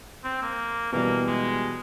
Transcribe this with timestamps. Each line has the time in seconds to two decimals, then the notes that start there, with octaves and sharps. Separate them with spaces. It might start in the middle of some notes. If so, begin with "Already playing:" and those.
0.24 C4
0.42 A#3
0.93 B2 E3 G3 A#3
1.26 G#3